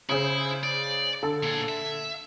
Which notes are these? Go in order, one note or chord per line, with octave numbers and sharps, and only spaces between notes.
C#3 E4 G#4 C5
D5
D3 A4
A#2 G#4
E5